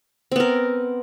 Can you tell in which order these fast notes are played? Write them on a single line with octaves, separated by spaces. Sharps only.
C4 B3 A#4